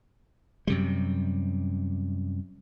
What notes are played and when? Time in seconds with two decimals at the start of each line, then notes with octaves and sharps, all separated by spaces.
0.67 F#2 C3 G3